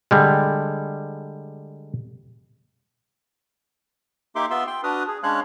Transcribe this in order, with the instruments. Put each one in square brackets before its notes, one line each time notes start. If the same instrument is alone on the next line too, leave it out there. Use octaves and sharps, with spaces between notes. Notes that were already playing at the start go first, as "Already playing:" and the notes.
[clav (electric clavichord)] D3 G3 G#3
[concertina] A#3 D#4 G4 E5 C6 D6
B3 F4 E5 C6 E6
G5 C6
D4 F#4 B4 D#6 F6
G#4
G#3 C#4 D4 C#5 F5 F#6